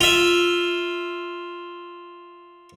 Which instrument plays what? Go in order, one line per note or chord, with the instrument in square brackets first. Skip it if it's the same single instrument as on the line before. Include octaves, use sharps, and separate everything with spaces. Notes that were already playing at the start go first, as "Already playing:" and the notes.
[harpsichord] F4 E5